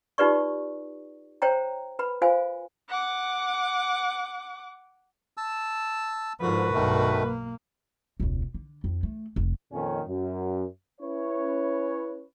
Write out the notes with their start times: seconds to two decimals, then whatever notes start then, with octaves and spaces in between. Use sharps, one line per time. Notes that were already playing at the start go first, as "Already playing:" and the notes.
0.18 D#4 F4 G4 B4 D5 C#6
1.42 C5 C#5 G5 A#5
1.99 B4 B5
2.22 F4 C5 F5 G#5
2.89 F#5 D6
5.37 A5 E6
6.41 G#2 D3 F3 F#4 A#4 B4
6.74 B1 G2 B2 D#3 A3
7.25 A#3
8.20 E1 C#2
8.54 D3
8.84 F2
9.03 A3
9.36 F1
9.72 F2 A#2 D#3 C#4
10.07 F#2
11.01 C#4 E4 B4 C#5